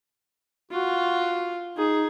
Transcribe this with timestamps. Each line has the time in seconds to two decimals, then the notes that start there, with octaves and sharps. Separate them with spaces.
0.71 F4 F#4
1.77 D#4 G#4